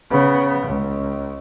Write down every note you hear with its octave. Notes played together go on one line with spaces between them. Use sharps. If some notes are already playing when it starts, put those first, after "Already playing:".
C#3 B3
C#2